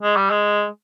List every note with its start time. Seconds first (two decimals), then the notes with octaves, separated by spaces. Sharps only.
0.03 G#3
0.16 G3
0.30 G#3